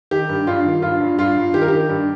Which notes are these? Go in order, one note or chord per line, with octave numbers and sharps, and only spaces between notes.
D#3 G4
G2
G2 F4
D#3
G2 F4
G2
G2 F4
G2
D#3 G4
A#4
D#3 G4
G2